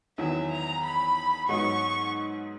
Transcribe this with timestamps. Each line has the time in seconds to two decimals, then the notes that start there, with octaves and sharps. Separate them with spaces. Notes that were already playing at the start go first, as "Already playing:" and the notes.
0.18 E2 D#3 F#3 B3 E4 E5
0.51 A#5
0.84 B5
1.49 G#2 F#3 B3 D#4 C#6